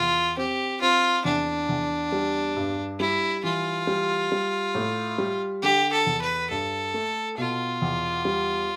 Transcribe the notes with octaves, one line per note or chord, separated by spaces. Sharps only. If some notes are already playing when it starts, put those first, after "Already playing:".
Already playing: E2 F4
C4 G4
C4 F4
E2 D4
E2
G3
G2
G3 E4
E3 F4
G3
G3
A2
G3
D3 G4
A4
E2
B4
G2 A4
A3
B2 F4
E2
G3